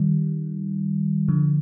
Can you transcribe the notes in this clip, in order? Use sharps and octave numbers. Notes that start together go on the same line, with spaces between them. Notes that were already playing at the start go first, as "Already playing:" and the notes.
Already playing: D#3 G3
D3 F3